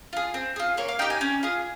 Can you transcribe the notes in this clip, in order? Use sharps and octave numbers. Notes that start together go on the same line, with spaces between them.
F4 G#4
C4
F4 G#4
A#3 C#5
F5
D#4 G4 G5
G#5
C#4
F4 G#4